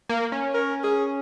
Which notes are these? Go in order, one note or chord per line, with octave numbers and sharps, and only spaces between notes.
A#3
C#4
A#4
G#4